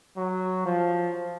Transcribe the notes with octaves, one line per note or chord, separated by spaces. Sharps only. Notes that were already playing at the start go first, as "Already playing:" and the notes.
F#3
F3